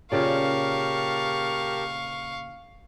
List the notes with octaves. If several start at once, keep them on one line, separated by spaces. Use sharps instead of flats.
A#2 C#3 G4 A#4 D5 F5 A5 C#6